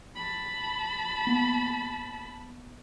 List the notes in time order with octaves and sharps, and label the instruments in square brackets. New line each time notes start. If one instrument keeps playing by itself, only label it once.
[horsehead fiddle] A5 B5
[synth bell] A#3 B3